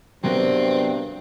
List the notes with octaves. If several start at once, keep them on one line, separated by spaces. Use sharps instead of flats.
G2 C3 F#3 B3 C4 A#4